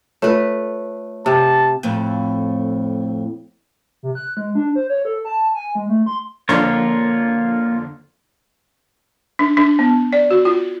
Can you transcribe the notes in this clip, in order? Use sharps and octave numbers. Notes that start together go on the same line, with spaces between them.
A3 F4 B4 C#5
C3 A5
F2 A2
C3
F#6
G#3
D4
C5
C#5
A4
A5
G#5
G#3
A3
C6
F2 D3 A#3 F4 C#5
D4
D4
B3
D5
F#4
F4